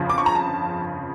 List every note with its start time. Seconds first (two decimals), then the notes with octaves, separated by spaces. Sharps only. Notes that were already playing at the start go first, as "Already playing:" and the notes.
Already playing: G1 F2 C#3 F3
0.10 D6
0.18 C#6
0.26 A#5
0.35 A5